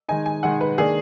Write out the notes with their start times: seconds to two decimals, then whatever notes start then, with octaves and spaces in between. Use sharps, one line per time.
0.08 D#3 G#3 D#4 G#5
0.26 G#5
0.43 D#3 G#3 D#4 F#5
0.61 B4
0.78 D#3 A#3 D4 G#4